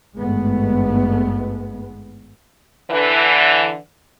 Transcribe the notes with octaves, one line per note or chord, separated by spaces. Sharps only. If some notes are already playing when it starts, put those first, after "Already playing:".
G#1 G2 G#3 A3 B3
D3 E3